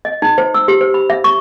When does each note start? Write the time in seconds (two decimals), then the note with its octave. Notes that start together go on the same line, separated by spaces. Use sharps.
0.05 D#5
0.22 D#4
0.38 C5
0.54 E6
0.68 G4
0.81 C5
0.94 B5
1.10 E5
1.24 C#6